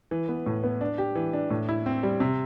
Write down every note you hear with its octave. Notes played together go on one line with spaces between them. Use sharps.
E3
B3
A2
B3
D4
G4
E3
D4
A2
E4
C4
G3
C3